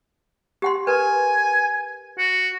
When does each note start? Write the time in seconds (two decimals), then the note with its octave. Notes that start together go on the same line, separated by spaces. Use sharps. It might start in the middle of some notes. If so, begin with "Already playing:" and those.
0.62 G4 F#5 C6
0.87 A#4 B4 G#5
2.18 F#4